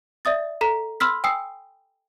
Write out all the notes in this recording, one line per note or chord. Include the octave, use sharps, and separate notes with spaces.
D5 E5 D#6 A6
A4 A#5 B6
B5 C6 E6 F6 B6
G5 G#5 D#6 E6 C7